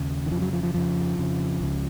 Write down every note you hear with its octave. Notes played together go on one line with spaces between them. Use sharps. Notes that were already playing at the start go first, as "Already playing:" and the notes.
Already playing: D#2 C#3
D#3
F2 C#3 F3
F#3
F3
F3
F2 C#3 F3
F2 C#3
C#2 C#3